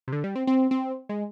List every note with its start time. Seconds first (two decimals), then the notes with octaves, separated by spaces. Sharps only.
0.08 C3
0.12 D3
0.24 G3
0.36 C4
0.47 C4
0.71 C4
1.09 G#3